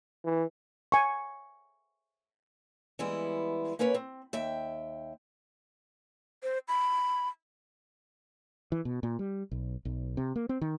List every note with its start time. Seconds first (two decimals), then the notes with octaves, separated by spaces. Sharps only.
0.25 E3
0.92 G#5 C#6
2.99 E3 G3 G#3 B3 E4
3.79 A#3 C#4 A#4 B4 C#5
3.94 C4
4.33 D#2 E5 G5
6.43 C5
6.68 B5
8.72 E3
8.85 B2
9.03 A#2
9.19 G3
9.51 B1
9.85 B1
10.17 C3
10.36 A#3
10.49 C4
10.61 D#3